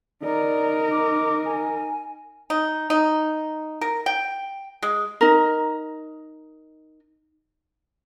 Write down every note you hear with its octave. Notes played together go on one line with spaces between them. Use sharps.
D#4 A#4 D5
D6
G#5
D#4
D#4
A#4
G5
G#3
D#4 A#4